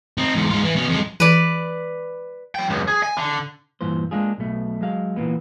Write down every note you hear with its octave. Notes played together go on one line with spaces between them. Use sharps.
C4 D#4
E2 G#2
G#2 F4
E3
B2 C#4
F2 G#3
E3 B4 D5
F#3 G5
C#2 F#2
G#4
G#5
D3
G2 A#2 E3 C5
G#3 A#3 D4 F4 G#4
B1 B2 A3
F#3 G#3 F5
A#2 E3 A#3 B3